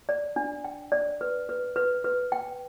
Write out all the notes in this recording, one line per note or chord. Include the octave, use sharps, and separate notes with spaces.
D5
D4
G5
D5
B4
B4
B4
B4
G5